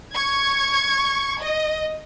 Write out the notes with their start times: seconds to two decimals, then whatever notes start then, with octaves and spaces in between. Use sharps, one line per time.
0.15 C#6 G#6
1.41 D#5